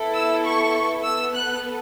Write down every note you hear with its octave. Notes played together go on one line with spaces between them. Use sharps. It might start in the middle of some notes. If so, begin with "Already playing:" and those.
Already playing: B3 E4 A4
E6
C#6
B3 A4 E6
F#6